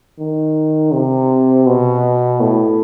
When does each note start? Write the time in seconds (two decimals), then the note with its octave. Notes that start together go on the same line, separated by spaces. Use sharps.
0.19 D#3
0.93 C3
1.67 B2
2.40 A2